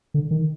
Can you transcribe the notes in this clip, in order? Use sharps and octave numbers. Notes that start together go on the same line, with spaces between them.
D3
D#3